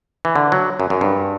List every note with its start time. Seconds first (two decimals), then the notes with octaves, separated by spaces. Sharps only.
0.25 E3
0.36 D3
0.52 F#3
0.80 F#2
0.90 F#2
1.01 G2